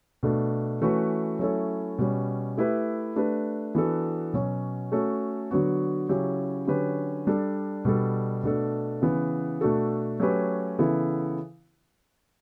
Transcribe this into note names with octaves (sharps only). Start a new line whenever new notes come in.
B2 A3 D4 A4
E3 A3 C#4 F#4 B4
F#3 A3 C#4 E4 A4
B2 G3 C#4
A3 E4 G4 B4
A3 D4 G4 B4
E3 B3 D4 F#4 A4
B2 F#3 C#4
A3 C#4 F#4 A4
D3 F#3 B3 F#4
C#3 F#3 C#4 E4 G4
D3 F#3 C#4 G4 B4
G3 D4 A4
B2 G3 D4 A4
B2 A3 D4 A4
C#3 E3 B3
B2 A3 D4 F#4 A4
F#3 A3 C#4 G4 B4
C#3 E3 B3 E4 A4